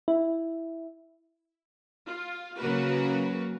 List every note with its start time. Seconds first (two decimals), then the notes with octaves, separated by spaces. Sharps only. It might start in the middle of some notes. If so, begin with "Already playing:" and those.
0.08 E4
2.06 F4
2.59 C#3 F#3 A#3 F#4 A#4 B4